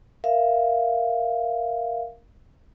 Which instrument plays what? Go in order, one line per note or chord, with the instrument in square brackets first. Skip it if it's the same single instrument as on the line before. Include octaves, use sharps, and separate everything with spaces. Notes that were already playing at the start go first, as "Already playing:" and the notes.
[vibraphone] A#4 E5 F5